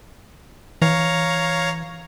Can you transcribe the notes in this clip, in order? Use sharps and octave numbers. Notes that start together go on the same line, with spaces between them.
E3 C#5 F5 A#5